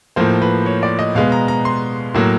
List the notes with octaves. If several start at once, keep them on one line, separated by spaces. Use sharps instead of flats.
A2 F3 A#3 C5
B4
C#5
D5
D#5
B2 G#3 B3 F5
A#5
A#5
C6
A2 F#3 A#3